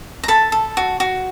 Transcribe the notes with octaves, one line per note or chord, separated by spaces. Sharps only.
A#5
A4 A5 B5
A4
F#4
F#4